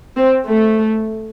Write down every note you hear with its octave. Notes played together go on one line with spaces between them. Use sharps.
C4
A3